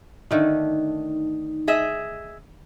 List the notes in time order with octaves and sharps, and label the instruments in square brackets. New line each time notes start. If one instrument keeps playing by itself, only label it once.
[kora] D3 D#3 A3 [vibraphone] D#4
[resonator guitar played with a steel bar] G#4 D#5 E5